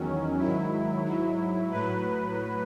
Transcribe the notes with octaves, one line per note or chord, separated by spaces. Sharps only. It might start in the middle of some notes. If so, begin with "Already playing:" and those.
Already playing: E2 D#3 F#3 C#4
G#2 D#3 F#3 E4
G#2 F#3
A2 F#3 B4